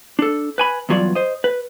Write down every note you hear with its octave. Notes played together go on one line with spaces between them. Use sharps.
D4 A4
B4 G#5 B5
E2 G2 F#3 F4 F#4 D5
C5 D#5
B4